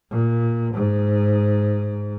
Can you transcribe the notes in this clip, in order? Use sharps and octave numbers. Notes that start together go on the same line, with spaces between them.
A#2
G#2